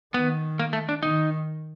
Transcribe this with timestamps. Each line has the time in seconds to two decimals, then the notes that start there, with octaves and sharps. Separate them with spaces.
0.14 D#3 B3
0.59 A#3
0.73 A3
0.89 D4
1.03 D#3 D#4